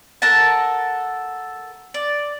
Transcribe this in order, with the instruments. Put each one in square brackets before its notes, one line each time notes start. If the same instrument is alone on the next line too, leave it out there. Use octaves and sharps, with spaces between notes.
[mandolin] A4 A#4 F#5 A5
D5